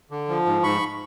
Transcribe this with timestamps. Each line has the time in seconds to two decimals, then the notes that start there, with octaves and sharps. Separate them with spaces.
0.11 D3
0.29 F3
0.46 G#2
0.63 G#2 B5 C#6